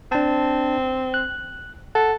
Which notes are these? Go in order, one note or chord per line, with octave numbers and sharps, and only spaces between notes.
C4 D4 A5
F#6
A4 F#5